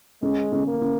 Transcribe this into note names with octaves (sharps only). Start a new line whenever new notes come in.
G#3 C#4
C#4
A#3
C#4